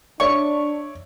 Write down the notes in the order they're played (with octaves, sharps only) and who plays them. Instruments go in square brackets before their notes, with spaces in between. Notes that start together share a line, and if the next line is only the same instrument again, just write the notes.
[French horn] D4 [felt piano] C#5 D5 E5 [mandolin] C#6